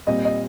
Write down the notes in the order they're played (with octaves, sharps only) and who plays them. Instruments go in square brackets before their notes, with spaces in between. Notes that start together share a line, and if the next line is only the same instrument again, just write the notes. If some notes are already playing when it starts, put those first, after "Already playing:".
[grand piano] A#2 G3 C4 [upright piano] D#5
[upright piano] D#5